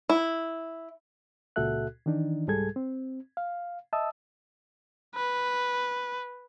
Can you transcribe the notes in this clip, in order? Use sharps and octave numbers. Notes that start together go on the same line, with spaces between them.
E4
C#2 A#2 F#4 A4 E5 F#6
D#3 E3 D4 D#4
C2 G#2 G3 G#4 A4 G#6
C4
F5
D#5 E5 A5 D#6 E6
B4